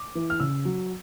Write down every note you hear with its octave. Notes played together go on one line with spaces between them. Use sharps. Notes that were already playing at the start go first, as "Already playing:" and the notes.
Already playing: D6
E3
F6
C#3 E6
F#3